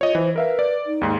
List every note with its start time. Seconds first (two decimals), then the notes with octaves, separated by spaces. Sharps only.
0.01 F4 C#5 D#5
0.15 E3 C5
0.36 A#4 B4 E5 F5
0.59 D5
0.86 D#4
1.01 D#2 G#2